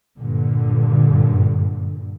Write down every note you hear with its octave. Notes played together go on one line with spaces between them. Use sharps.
G2 A#2 D3